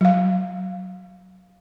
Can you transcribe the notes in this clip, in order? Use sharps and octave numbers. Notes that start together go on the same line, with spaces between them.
F#3 F5